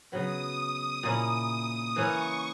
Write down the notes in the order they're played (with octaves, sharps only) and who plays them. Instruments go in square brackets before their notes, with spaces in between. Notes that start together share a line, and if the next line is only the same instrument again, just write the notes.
[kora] C#3 F#3 B3 [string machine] D#6
[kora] A#2 A#3 C#4 E4
[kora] E3 A#3 C#4 E4 [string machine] C#6